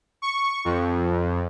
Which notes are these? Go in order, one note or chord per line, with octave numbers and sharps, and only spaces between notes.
C#6
F2